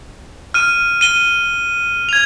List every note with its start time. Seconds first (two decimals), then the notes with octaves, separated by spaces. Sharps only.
0.54 F6 D#7
1.01 D#7 G7
2.09 G#6 F7